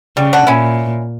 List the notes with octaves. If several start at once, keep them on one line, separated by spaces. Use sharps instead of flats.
C#3 G3
D4 F#4
A#2 C#4 E4